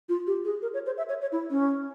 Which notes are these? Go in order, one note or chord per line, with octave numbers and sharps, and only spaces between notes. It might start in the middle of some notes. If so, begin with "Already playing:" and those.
F4
G4
G#4
A#4
C#5
C5
E5
C#5
C#5
E4
C#4